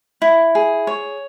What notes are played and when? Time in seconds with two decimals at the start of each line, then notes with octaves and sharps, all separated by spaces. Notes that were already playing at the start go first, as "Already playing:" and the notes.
0.22 E4
0.55 G#4
0.87 C#5